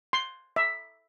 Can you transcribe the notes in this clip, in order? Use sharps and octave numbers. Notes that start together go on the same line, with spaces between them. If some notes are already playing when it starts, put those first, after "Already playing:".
C6
E5